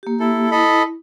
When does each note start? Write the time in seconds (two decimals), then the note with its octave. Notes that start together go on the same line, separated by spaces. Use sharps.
0.03 A#3 G4
0.20 E4 A4
0.51 E4 A4 D#5 B5